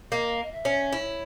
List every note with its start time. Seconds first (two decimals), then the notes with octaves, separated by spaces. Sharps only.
0.11 A#3 D#5
0.42 D#5
0.52 E5
0.65 C#4
0.92 E4 C#5